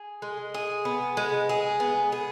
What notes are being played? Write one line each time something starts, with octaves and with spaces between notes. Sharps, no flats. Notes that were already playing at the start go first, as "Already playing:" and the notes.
Already playing: G#4
G#3
G#4
B3
G#3
G#4
B3
G#4